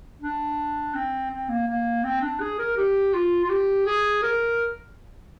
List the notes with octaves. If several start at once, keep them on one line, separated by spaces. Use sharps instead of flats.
D4
C4
C4
A#3
A#3
C4
D4
G#4
A#4
G4
F4
F4
G4
G#4
A#4